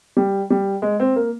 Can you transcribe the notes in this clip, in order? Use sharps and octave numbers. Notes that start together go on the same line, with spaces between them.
G3
G3
G#3
C4
A#3